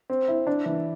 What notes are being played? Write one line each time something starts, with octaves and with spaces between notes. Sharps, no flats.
C4
E4
D4
E3